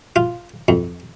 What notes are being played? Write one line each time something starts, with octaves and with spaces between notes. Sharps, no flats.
F4
F2